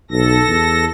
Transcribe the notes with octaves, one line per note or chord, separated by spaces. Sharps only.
B1 A4 A#6
E2